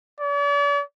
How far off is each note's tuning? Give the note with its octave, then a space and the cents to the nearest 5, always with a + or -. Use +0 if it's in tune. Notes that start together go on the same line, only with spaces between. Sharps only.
D5 -45